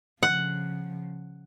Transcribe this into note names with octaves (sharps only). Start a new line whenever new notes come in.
C#3 F3 F#5